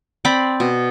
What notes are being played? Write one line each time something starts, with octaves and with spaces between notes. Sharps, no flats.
C4 D5 B5
B2